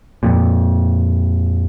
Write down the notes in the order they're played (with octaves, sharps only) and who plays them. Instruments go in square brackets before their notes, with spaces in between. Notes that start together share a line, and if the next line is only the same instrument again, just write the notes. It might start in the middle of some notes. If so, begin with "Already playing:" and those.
[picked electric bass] F2 A#2